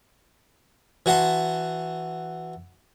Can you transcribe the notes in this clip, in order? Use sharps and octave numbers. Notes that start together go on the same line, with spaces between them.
E3 F#4 F#5 A5 C6